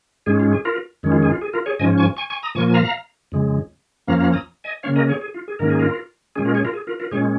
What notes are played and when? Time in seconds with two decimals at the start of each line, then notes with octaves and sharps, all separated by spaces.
0.26 G#2 G#3 C#4 G#4
0.40 F4
0.53 G#4
0.65 F4 A#4
1.03 F2 D#3 G#3 C#4
1.12 F4
1.23 G#4
1.31 F4
1.41 G#4
1.53 F4 A#4
1.66 G#4 C#5
1.79 G#2 F3 C#4 D#5 G#5
1.98 G#5 C#6
2.17 G#5 C#6
2.30 G#5 C#6
2.43 A#5 D#6
2.55 A#2 F3 A#3 G#5 C#6
2.67 G#5
2.74 F5 A#5
3.32 F2 C#3 G#3
4.07 F2 F3 A#3 C#4 F5 A#5
4.20 F5 A#5
4.33 A#5 D#6
4.64 D#5 G#5
4.83 C#3 A#3 C#4 C#5 F5
4.96 A#4 D#5
5.09 G#4 C#5
5.21 G#4
5.34 F4
5.48 G#4
5.59 G#2 D#3 A#3 C#4 A#4
5.70 G#4
5.79 F4 A#4
6.36 A#2 G#3 C#4 G#4
6.45 F4 A#4
6.55 G#4 C#5
6.65 F4 A#4
6.73 G#4
6.87 F4 A#4
7.00 F4 A#4
7.11 A#2 G#3 C#4 G#4 C#5